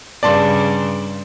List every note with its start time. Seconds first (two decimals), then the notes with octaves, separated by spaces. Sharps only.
0.23 G2 C#3 D5 A5 C6